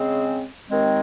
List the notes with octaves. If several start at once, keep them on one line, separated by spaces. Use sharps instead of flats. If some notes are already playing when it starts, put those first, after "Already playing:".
Already playing: C#3 G#3 C4
D#2 D#3 G#3 C4